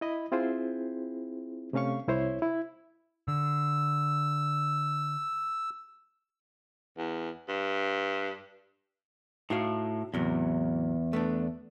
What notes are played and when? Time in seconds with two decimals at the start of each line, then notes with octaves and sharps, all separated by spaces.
0.01 E4 D#5 B5
0.32 C4 E4 F4 G#4 C5
1.73 C3 A3 C#4 F5 C#6
2.08 C2 E4 C5 C#5
2.42 E4
3.28 D3 E6
6.98 E2
7.49 G2
9.50 A2 D#4 F#4 F5
10.14 E2 A2 C3 F#3
11.13 A3 B3 D4